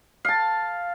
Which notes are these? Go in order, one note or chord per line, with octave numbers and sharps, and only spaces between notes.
F5 A5